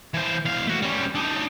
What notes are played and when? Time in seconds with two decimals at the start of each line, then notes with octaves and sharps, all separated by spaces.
0.14 E3 C5
0.45 E2 F5
0.67 A3 F#4
0.82 G3 C#4
1.15 D4 D#4